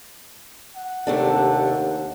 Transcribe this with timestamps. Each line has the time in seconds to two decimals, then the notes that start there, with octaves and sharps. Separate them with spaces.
0.76 F#5
1.07 D#2 C3 A3 D4